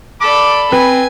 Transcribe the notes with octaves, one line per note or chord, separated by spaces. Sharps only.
A4 D5 B5 D6
C4 B4 G#5